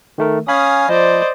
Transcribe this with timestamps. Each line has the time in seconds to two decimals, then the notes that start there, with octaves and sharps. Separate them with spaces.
0.18 D#3 A3 A#4
0.48 C#4 F5 G#5 B5 D#6
0.89 F3 C5 D5 D#5